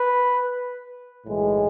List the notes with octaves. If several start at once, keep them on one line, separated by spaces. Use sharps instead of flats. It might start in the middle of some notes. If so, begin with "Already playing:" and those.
Already playing: B4
B1 A2 E3 G#3